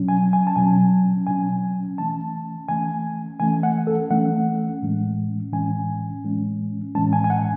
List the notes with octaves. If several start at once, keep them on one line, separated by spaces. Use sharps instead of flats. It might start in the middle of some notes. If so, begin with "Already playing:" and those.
Already playing: B2 F#3 C#4
G#5
G#5
A5
B2 F#3 C#4 G#5
B2 F#3 C#4 G#5
E3 A3 C#4 A5
E3 A3 C#4 G#5
E3 A3 C#4 G#5
F#5
A4
E3 A3 C#4 F#5
A2 E3 G#3 C#4
A2 E3 G#3 C#4 G#5
A2 E3 G#3 C#4
A2 E3 G#3 C#4 A5
G#5
G#5
F#5